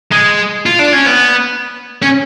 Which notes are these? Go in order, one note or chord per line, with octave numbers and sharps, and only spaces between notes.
G#3
F4
D4
C#4
B3
C#4